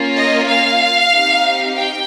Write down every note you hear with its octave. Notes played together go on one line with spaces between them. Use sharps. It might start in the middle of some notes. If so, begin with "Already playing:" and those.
Already playing: A#3 C#4 F4
D#5
F5
C4 D#4 G4
G5